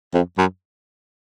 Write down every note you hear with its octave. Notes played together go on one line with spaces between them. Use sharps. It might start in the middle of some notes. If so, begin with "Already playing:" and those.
F2
F#2